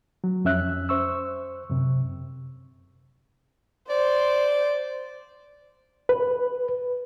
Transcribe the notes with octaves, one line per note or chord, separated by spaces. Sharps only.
F#3
F2 C#4 E5 F#6
C5 C#6 E6
F#2 C3
C5 D5
B4